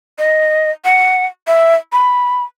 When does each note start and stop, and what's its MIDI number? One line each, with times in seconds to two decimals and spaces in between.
0.18 0.71 75
0.85 1.26 78
1.47 1.75 76
1.92 2.44 83